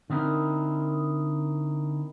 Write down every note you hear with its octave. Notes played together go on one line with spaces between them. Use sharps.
D3 C4 D#4 E4 A#4